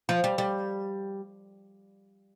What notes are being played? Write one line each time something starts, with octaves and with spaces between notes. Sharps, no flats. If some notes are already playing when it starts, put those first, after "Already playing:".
F3
G3
G3